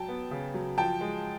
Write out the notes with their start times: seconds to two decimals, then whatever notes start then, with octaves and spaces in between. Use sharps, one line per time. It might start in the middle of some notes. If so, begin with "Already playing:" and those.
Already playing: F#3 G5 A5
0.08 B3
0.31 C#3
0.54 F#3
0.78 F3 G5 A5
1.01 G#3